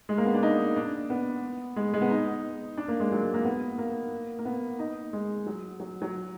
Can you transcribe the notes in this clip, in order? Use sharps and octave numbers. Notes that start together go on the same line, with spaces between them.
G#3
A#3
B3
D4
D#4
D4
B3
G#3
G#3
B3
D#4
D4
A#3
G#3
F#3
G#3
A#3
B3
A#3
A#3
B3
D#4
G#3
F#3
F#3
F#3